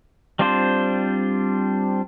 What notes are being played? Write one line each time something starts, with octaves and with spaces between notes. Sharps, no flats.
G3 C4 D4 F4 C5